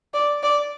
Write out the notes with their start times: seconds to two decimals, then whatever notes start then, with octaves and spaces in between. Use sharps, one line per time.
0.14 D5
0.43 D5